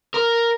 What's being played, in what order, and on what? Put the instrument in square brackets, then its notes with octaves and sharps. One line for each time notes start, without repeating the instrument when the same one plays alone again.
[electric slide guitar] A#4